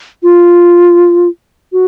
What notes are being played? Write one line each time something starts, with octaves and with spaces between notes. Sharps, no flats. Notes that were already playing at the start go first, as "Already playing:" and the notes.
F4
F#4